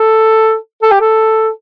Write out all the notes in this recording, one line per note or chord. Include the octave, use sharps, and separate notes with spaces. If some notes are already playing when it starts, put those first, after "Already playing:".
Already playing: A4
A4
G4
A4